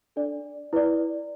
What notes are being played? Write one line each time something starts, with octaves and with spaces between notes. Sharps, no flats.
D4 A4 D5
E4 B4 D5